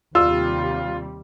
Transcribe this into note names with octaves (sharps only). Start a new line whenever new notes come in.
D#2 C3 G3 F4 E6